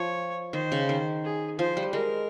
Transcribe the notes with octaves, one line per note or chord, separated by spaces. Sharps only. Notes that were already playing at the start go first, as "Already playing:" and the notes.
Already playing: F3 C#5
D#3 C5
C#3
D#3
G#4
F3 C5
G3
G#3 A#4